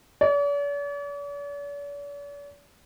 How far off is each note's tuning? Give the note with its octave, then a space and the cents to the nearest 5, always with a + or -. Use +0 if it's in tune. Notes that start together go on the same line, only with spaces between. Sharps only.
D5 -45